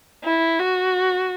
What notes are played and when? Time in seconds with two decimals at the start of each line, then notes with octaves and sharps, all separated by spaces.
0.25 E4
0.59 F#4